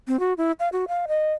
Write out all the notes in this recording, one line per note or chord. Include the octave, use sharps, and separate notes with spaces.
C4
F#4
E4
F5
F#4
F5
D#5